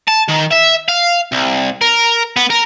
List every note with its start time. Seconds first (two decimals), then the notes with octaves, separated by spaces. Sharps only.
0.08 A5
0.29 D#3
0.52 E5
0.88 F5
1.32 C2
1.81 A#4
2.37 B3
2.50 A#4